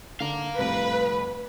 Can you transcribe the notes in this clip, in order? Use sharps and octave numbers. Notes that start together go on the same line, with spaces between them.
D3 F5 A#5
C2 F2 A2 B4